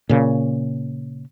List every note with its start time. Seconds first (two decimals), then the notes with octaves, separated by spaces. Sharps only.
0.09 A#2 C#3